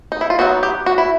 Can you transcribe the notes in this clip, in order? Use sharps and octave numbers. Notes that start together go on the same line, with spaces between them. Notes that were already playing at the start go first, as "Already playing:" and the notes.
D#4
E4
F4
F#3 B3 D#4 F#4
G4
F#4
E4